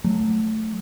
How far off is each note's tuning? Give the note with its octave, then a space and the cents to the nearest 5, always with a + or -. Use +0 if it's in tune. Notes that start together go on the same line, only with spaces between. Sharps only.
F#3 +0 A3 +0